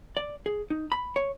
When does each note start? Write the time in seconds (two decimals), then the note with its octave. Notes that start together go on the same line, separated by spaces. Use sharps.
0.17 D5
0.46 G#4
0.70 D#4
0.92 B5
1.16 C#5